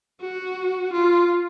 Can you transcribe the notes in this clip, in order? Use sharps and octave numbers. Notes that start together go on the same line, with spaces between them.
F#4
F4